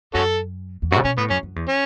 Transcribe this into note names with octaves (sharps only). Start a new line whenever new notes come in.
F#2 C#4 F#4 A4
E2
F#2 F#4
C#3
B2 C#4
A2 B3
F#2 C#4
F#2
E2
C#4